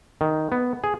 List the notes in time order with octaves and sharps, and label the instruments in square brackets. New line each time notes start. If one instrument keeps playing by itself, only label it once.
[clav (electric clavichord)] D#3
B3
G#4